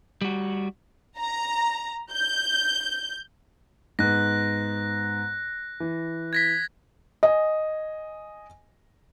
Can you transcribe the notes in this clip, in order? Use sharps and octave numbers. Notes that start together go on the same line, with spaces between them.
G3 F#4
A#5
G6
G#2 B3 F#6 A#6
E3
G#6 A#6 B6
D#5 G#5